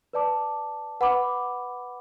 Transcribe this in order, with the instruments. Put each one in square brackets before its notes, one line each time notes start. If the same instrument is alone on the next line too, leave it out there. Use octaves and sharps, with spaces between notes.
[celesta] B4 D5 A5 D6
B4 F#5 B5 D6